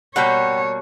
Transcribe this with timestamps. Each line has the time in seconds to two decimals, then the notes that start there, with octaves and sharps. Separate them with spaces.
0.16 B2 G3 A#3 C#5 F#5 G5 B5